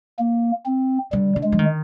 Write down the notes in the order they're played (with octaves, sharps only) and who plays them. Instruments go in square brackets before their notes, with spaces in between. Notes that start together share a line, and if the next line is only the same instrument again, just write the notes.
[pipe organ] A#3
C4
[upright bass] D3 [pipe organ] G3
[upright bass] D3
[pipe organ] G#3
[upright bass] F3
D#3